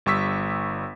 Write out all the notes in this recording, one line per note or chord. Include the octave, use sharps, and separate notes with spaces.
G1 G3 C#6 E6 B6